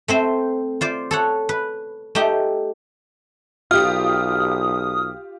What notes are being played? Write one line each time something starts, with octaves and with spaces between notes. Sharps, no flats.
A3 C4 C5
F4 C5 D5
A4 C#5 F#5
B4
A3 D#4 G4 G5
B1 F4 G4 D#6 F6